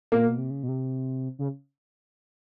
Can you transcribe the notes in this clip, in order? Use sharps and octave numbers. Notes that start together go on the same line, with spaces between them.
A#2 A#3
B2
C3
C#3
B2
C3
C#3